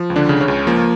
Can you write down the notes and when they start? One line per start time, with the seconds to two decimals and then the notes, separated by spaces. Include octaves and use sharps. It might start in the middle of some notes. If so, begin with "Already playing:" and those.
Already playing: F3
0.10 C#2
0.16 D3 D4
0.29 C#3
0.41 C#3 C#4
0.48 C#2
0.67 F3 A#3